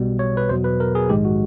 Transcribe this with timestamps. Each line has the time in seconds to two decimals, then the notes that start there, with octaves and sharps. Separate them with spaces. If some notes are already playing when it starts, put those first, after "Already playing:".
Already playing: B1 B2 G3
0.19 C#5
0.37 B4
0.49 E2 B2 F#3 C5
0.64 B4
0.80 A#4
0.95 G#4
1.09 A#1 G#2 D#3 G#3 G4
1.25 F#4